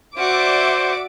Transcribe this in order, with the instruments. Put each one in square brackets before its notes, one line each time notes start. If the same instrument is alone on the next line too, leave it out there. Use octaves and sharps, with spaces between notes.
[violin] F#4 [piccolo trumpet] C5 [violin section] D5 E5 D6